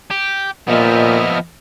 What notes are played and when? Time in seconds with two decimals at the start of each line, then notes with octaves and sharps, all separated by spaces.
0.11 G4
0.68 A#2 F3 B3 D#5 E5 F6